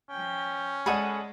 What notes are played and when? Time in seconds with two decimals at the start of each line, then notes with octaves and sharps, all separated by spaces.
0.10 F3 C#4 G5
0.86 G#3 G#4 A4 D5 F#5 B5 D#6